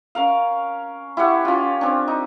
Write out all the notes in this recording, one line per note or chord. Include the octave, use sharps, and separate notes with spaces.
C#4 A#4 F5
E4 G4 C#5 F#5
C#4 F4
C4 D4
D#4